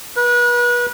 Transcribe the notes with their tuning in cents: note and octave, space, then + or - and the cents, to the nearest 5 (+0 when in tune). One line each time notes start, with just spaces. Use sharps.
B4 -35